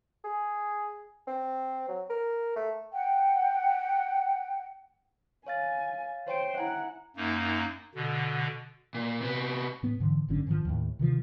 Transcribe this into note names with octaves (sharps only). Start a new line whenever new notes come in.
G#4
C4
F#3
A#4
A3
F#5 G5
C#5 F5 G#5 A6
C5 C#5 G5 D7
E4 F#5 G#5 A#5
F#2 A#3 D#4
B2 D3
A#2
C3 B3
A2 B3
G#2 D3 E3
G#1 F#2 D3 C#4
G#2 D#3 F3
D#2 A2
C3 D#3 F3